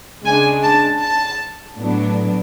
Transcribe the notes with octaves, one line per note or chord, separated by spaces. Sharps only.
C#3 G#3 D4 G#5
A5
A5
A2 F#3 B3 D4